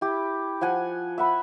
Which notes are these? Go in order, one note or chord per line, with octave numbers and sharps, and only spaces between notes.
E4 G4
F3 F#5 G#5
E5 F#5 B5